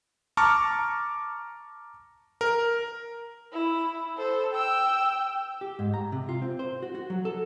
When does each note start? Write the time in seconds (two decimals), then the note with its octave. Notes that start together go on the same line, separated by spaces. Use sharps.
0.37 A5 A#5 C#6 D6 F6
2.41 A#4
3.52 E4
4.17 A4 C5
4.52 G5 E6
5.61 G4
5.79 G#2
5.94 A#5
6.12 C3
6.29 F4
6.42 C4
6.59 C5
6.83 F#4
6.95 F#4
7.10 F#3
7.25 A4